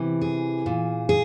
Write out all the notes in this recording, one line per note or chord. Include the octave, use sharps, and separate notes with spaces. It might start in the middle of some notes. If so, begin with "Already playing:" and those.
Already playing: C3 E3
G#4
A#2
G#4